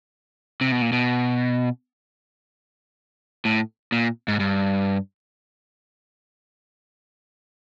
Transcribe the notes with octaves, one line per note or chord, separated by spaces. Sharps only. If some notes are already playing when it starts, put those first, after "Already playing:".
C3
B2
A#2
B2
A2
A#2
G#2
G2